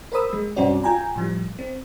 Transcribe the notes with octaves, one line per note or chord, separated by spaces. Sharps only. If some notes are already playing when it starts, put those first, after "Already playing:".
A#4 C5 B5 D#6 E6
G#3
C2 G2 C4 C#4 F#4 D5
F4 G5 G#5 A#5
A2 F3 G3
C4